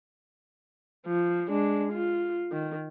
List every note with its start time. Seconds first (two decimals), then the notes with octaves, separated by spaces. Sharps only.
1.07 F3
1.49 G#3 D4
1.93 F4
2.52 D#3